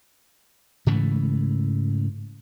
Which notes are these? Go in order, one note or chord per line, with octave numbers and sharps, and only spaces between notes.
G#2 C#3 E3 A3